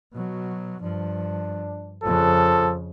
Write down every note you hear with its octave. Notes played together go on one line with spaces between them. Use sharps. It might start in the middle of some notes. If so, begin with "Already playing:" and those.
B2 F#3
G2 F3 D4
F2 C#3 F3 A4